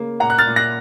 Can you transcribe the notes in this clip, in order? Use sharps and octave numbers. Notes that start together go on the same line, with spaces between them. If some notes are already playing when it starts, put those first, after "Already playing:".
Already playing: C#3 A#3
A#2 F#5 A#5
F#6
F6 A6
A#2
F#6 A#6